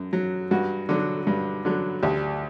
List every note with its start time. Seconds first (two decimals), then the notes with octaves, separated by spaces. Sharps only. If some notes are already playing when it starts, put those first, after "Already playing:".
Already playing: F#2
0.13 F#3
0.51 G2 F#4
0.89 D3 F#3
1.27 G2
1.65 D3 F#3
2.02 D2 G4